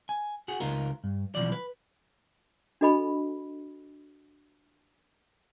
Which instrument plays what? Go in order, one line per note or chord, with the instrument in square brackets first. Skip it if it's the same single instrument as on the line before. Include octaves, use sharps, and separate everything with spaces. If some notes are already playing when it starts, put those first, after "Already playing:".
[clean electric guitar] G#5
F#4 G#4
C#2 D#4 F4 A#4
G2
B1 E3 F3 D5
B4
[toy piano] D4 F#4 A4 D#5 G#5 B5